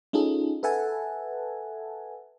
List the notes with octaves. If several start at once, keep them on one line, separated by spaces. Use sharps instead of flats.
C#4 D#4 F4 G#4 A4
A4 B4 E5 F#5 G#5 A5